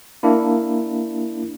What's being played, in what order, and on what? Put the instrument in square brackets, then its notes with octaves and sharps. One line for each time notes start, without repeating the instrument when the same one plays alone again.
[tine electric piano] A#3 D4 E4